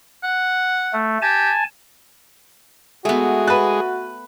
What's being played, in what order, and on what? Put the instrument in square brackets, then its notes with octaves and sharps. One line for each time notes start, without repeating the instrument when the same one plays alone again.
[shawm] F#5
[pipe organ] A3
[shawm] G4 [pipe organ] G#5 A5
[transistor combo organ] G#3 G#4 [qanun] A3 B3 [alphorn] F#4
[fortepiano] B4 F#6 [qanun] A5